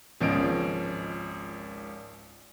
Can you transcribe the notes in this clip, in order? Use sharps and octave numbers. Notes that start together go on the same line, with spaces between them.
G#1 C#2 F3 C#4 D#5 D7